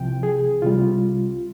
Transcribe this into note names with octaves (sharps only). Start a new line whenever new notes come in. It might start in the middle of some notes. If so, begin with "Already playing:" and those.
Already playing: C2 C3 F3 G5
G#4
C2 C3 G3 F4